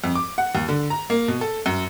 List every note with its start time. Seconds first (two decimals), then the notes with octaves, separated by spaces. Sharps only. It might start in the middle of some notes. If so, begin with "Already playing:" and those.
0.04 F2
0.15 D6
0.38 F#5
0.55 D#2
0.69 D3
0.90 A#5
1.10 A#3
1.28 B2
1.41 A4
1.66 F#2